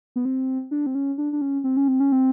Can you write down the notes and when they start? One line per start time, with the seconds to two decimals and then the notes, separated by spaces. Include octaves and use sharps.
0.16 B3
0.25 C4
0.71 D4
0.86 C4
0.95 C#4
1.18 D4
1.33 D4
1.41 C#4
1.64 C4
1.77 C#4
1.88 C4
2.00 C#4
2.12 C4